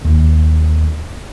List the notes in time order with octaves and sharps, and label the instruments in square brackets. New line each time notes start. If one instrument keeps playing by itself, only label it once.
[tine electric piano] D#2